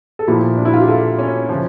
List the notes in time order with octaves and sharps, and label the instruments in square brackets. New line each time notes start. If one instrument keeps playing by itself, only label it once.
[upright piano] A4
A#2 F3 E4 G4
D4
E4
F4
G4
F4 A4
C#4
C#3 F3